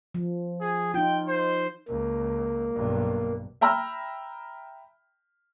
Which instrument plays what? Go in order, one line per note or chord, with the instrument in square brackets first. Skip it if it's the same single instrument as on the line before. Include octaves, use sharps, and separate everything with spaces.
[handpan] F3
[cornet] G#4
[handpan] D#4 F4 [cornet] G5
[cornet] C5
[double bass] C#2 [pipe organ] A#3
[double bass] B1 G2
[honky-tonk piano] E5 G5 A#5 B5 E6 F6